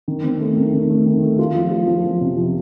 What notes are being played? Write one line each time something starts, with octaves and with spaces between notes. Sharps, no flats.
D#3
C4
A3
D#3
D#3
A3
D#3
A3
F4
F3
F4
F3
F3
C3
F3